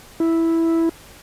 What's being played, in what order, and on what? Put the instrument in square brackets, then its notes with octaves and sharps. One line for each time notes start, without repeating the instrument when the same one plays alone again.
[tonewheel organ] E4